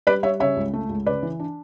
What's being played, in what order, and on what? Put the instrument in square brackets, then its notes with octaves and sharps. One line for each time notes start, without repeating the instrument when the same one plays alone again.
[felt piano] G3 B4 D5
G3 C#5 E5
C#3 C#5 E5
C#2
A3
C#2
C#3 B4 D5
E3
D4